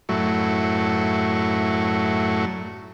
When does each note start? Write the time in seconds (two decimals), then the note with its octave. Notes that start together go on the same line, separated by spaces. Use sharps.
0.09 F#2 A2 F#3 A3 E4 C#6